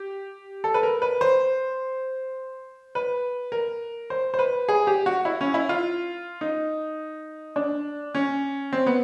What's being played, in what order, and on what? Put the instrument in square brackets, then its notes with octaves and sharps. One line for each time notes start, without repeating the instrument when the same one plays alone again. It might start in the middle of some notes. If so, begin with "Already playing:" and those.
Already playing: [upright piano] G4
A4
B4
A#4
B4
C5
B4
A#4
C5
C5
B4
G#4
G4
F#4
E4
C#4
E4
F4
D#4
D4
C#4
C4
B3